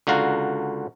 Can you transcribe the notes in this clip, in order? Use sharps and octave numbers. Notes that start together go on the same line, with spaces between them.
C#2 D3 F#4 F5 A#5